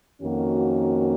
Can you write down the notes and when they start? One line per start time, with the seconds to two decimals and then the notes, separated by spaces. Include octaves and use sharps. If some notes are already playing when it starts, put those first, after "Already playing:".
0.21 F2 D#3 A#3 C#4 F#4